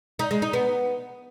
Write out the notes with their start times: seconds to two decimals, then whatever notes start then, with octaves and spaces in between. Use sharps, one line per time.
0.19 D#4
0.31 G#3
0.42 D#4
0.53 B3